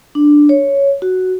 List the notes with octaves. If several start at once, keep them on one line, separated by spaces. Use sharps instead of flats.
D4
C#5
F#4